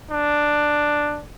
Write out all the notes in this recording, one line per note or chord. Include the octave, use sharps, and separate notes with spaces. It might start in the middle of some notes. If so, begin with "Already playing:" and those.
D4